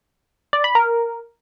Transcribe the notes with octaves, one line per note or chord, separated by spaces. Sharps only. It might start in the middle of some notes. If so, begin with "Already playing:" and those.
D5
B5
A#4